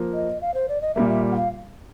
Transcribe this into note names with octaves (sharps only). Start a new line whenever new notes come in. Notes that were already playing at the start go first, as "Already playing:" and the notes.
Already playing: F3 A#3
D#5
F5
C5
D5
D#5
A#2 G3 A#3 E5
E5
F#5
F5